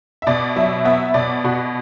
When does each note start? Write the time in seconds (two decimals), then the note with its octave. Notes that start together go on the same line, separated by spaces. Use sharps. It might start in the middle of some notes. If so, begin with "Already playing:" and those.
0.22 E5
0.27 B2 D5
0.56 F#3 E5
0.85 B3 E5
1.14 B2 D5
1.44 B2 F#4